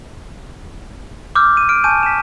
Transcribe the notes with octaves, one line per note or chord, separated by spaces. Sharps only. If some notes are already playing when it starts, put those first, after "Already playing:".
D6 E6 F6 G6
D#7
F6 D7
G#5 A5 C#6 G6 D#7
B6 E7